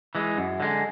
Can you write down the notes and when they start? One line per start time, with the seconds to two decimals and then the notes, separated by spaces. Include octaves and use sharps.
0.15 E3 G#3
0.38 F#2
0.60 D3 G#3